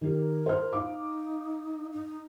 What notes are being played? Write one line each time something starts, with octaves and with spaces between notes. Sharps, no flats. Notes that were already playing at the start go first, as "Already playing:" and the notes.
D#3 G4 A#4
C5 F6
D#4 F5 D6
D#4